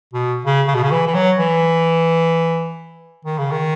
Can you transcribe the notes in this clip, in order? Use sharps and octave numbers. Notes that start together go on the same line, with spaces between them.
B2
C#3
C#3
B2
C#3
E3
E3
F#3
E3
D#3
C#3
D#3